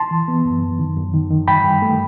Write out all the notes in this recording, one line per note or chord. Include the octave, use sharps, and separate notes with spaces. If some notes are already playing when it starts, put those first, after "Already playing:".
Already playing: A5 C6
E3
B3
F#2
F#2
D#3
F#2
D#3
D#3
G2 G5 B5
G2
A3